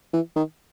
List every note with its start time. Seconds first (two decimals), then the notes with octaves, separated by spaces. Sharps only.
0.13 E3
0.36 D#3